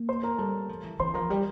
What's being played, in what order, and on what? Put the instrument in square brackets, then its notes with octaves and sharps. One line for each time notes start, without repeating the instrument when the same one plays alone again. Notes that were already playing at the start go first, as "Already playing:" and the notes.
Already playing: [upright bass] A#3
[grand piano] C5 C6
A#4 A#5
[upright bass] G3 [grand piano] A4 A5
[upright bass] F3
E3
[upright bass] E3 [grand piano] C5 C6
[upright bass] F3 [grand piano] A#4 A#5
[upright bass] G3 [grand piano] G4 G5